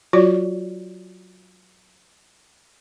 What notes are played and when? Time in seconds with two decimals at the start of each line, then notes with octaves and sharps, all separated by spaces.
0.13 F#3 F4 F#4 C#5 D5